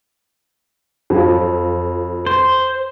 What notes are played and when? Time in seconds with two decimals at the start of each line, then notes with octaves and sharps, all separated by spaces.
1.10 F2 F#3 F4
2.27 C5